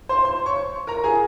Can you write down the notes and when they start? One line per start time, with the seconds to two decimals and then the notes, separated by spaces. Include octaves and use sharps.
0.09 C5 C6
0.25 C5 C6
0.46 C#5 C#6
0.87 A#4 A#5
1.04 G#4 G#5